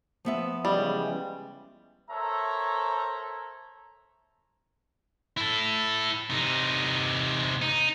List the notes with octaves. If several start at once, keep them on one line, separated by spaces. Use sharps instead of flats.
F3 B3 E5
C#3 E3 G3 G#3
A4 A#4 C5 C#5 E5 A#5
E4 A4
C3 D#4
D#4